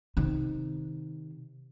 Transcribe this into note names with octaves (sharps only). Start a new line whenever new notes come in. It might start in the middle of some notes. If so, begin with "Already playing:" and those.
C3 D#3